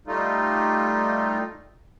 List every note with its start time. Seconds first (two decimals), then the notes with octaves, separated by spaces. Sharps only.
0.07 G3 A3 D#4 F4